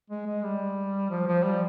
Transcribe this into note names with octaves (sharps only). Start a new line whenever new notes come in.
G#3
G#3
G3
F3
F3
G3